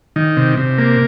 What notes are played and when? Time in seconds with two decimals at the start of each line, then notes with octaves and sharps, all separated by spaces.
0.16 D#3
0.37 C3
0.57 C3
0.78 A#3